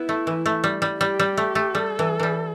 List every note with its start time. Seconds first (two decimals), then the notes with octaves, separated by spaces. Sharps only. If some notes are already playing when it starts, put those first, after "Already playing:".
Already playing: B3 E4
0.09 A3
0.27 E3
0.46 A3
0.64 G3
0.82 G3
1.01 G3 G4
1.19 G3
1.37 A3
1.55 A3
1.75 G3 A4
1.99 E3
2.20 E3 G3